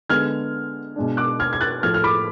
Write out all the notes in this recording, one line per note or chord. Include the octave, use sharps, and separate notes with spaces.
D3 G#3 B3 F6 G#6
B2 G#3 D4
D6 F#6
F6 G#6
G#6
F#6 A6
A2 F3 A3 F6 G#6
F6
B5 D6